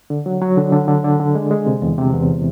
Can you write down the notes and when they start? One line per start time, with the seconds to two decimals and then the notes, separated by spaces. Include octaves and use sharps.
0.10 D3
0.26 F#3
0.42 F#3
0.58 D3
0.72 D3
0.88 D3
1.04 D3
1.20 D3
1.35 G#3
1.51 G#3
1.67 C3
1.82 E2
1.98 C3
2.14 E2